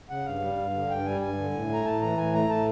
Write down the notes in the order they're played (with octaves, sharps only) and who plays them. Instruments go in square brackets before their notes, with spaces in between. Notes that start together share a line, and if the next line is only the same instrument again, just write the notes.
[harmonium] C#3 F#5
G2 F5
G3
G2
D3
G2 G5
G3 G#5
G2 G#5
D3
A2
A3 A#5
A2 A5
E3 A#5
A2 G#5
A3 A#5
A2 A5